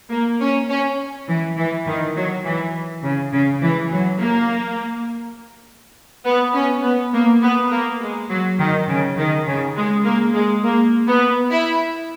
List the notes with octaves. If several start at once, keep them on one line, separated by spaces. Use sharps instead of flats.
A#3
C#4
C#4
E3
E3
D#3
F#3
E3
C#3
C#3
E3
F#3
A#3
B3
C#4
B3
A#3
B3
A#3
G#3
F#3
D#3
C#3
D#3
C#3
G#3
A#3
G#3
A#3
B3
E4